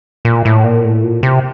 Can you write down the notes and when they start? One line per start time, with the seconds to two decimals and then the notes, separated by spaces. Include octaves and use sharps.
0.25 A#2
0.45 A2
0.64 A#2
0.84 A2
1.03 A#2
1.23 C3